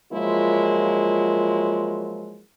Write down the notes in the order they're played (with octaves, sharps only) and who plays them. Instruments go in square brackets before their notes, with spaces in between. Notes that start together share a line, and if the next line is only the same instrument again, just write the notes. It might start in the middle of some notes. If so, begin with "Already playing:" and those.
[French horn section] F3 F#3 G#3 A#3 E4 F4